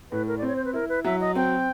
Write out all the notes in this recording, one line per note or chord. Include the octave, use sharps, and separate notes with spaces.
A2 B4
A#4
D5
C4
C#5
C5
B4
E4 A#4
B4
F#3 E5
D#5
C4 G5